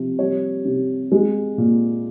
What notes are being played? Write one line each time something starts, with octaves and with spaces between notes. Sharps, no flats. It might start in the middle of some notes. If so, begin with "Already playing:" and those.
Already playing: C3 F3
G3 C#5
C3
G#3
A#2